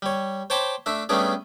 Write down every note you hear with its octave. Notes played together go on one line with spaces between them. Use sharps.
G3 C#5
C5 C#5 G5 A5 B5 D6
A3 D4 E5
G3 A3 B3 C#4 D4 G#4